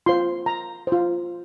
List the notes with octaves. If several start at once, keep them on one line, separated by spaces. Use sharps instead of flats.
F4 C5 C6
A#5
F4 C5